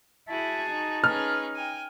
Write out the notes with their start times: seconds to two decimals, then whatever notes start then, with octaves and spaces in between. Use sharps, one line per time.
0.29 E4 F#4 G#4 A5
0.71 D#4
1.04 C#4 G#4 B4 F6
1.56 G5 G#5